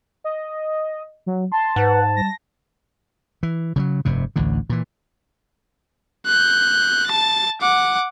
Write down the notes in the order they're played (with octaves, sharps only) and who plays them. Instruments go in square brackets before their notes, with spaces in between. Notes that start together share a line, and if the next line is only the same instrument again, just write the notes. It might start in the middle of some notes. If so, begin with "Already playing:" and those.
[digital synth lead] D#5
F#3
[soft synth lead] A5 [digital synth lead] C6
[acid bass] G#2 [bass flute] B4 [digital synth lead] F#5
[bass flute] G3 [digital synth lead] A#6
[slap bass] E3
C#3 F3 F#3
F1 G2 C3
A1 D2 A2 D3
A#2 E3
[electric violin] F#6 G6
A5 A6
F#5 D6